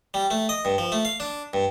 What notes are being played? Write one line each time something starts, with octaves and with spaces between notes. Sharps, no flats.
G3
A3
D#5
G2
F3
A3
F5
D4
G2